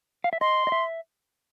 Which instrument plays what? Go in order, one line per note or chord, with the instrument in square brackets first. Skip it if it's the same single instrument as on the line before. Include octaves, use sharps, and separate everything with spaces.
[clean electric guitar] F5
E5
[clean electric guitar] D#5 [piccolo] C6
[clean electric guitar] D#5
E5